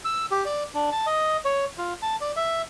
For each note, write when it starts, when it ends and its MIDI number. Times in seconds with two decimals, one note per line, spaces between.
0.05 0.26 88
0.31 0.44 67
0.45 0.64 74
0.75 0.90 62
0.92 1.06 81
1.06 1.37 75
1.45 1.65 73
1.78 1.93 65
2.02 2.16 81
2.21 2.32 74
2.37 2.62 76